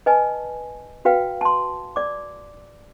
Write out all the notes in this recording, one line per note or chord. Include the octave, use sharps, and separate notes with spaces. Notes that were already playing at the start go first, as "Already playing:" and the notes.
B4 D#5 G#5 A5
F#4 B4 F5 G5
A5 C6
D5 D6